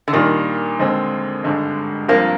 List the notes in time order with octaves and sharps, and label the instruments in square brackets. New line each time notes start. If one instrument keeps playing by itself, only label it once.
[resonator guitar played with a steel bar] D3
[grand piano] A#2 G3 D4 F4 [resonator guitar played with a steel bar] D#3
[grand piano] D#2 D3 G#3 C4
G#1 G2 D3 G#3
[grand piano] G1 G2 F3 C4 [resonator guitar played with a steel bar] A#3